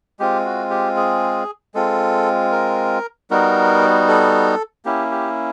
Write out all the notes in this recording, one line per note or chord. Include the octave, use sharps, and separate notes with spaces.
G#3 C4 F4 G4
F#4
G4
G#4
G#3 C4 F4 A4
A#4
G3 B3 D#4 F#4 A#4
A4
A#3 C#4 E4 G4
G4